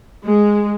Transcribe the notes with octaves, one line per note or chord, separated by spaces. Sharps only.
G#3